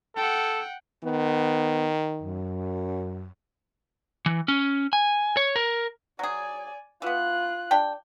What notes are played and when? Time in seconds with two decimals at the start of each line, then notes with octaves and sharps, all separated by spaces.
0.16 A4 F#5 G5
1.04 D#3 B3
2.22 F#2
4.26 E3
4.48 C#4
4.93 G#5
5.37 C#5
5.56 A#4
6.19 F#3 G#4 D5 G#5
7.02 E3 B3 F4 F#6
7.71 D4 G4 G5